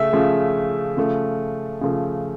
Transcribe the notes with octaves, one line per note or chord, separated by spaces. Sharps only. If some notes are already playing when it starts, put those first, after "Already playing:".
Already playing: C#3 A3 E5
C#3 F3 A3
C#3 F3 A3
C#3 F3 A3